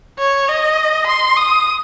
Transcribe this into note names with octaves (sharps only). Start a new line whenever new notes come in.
C#5
D#5
C6
D#6